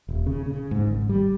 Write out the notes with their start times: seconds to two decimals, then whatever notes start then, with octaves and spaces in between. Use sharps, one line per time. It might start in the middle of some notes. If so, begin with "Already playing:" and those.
0.09 D#1
0.26 C#3
0.46 C#3
0.71 G#2
0.87 G#1
1.09 G3